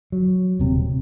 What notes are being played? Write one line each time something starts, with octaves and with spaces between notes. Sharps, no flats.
F#3
D#1 C3